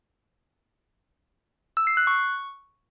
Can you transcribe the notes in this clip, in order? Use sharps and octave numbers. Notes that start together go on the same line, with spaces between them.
E6
C7
F#6
C#6